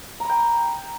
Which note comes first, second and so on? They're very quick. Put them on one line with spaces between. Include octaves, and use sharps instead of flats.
A#5 B5 G5